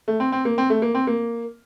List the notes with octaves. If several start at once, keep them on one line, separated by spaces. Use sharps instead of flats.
A3
C4
C4
A#3
C4
A3
A#3
C4
A#3